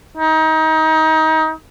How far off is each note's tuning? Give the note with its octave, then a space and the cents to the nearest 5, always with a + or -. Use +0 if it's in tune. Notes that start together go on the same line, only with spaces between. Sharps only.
D#4 +25